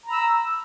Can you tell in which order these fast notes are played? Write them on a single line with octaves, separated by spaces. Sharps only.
A#5 B5 E6